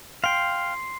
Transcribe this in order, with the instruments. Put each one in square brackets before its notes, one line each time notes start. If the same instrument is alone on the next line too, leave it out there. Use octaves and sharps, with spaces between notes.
[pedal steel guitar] F5 G5 [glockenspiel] C6 C7